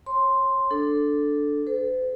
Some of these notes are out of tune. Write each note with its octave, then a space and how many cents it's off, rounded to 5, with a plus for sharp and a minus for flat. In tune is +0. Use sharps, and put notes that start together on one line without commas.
C#5 -25 C6 +0
D4 +0 A4 +0
A4 -20 C5 -40